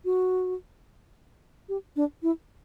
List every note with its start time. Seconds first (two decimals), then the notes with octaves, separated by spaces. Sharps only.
0.05 F#4
1.69 G4
1.96 D4
2.23 E4